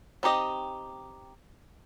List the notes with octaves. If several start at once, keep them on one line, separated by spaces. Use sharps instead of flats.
C4 D#4 G4 D#5